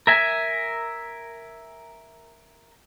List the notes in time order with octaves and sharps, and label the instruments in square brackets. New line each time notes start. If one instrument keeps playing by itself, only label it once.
[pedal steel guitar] A#4 E5 G#5